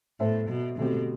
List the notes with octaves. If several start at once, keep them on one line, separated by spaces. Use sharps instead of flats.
A2 B3 D4 A4 C5 E5
B2
B2 D3 A3 C4 G4